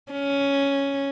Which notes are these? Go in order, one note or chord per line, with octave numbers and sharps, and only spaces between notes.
C#4